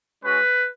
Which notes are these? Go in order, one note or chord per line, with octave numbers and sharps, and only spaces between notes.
G#3 C#4 F#4 B4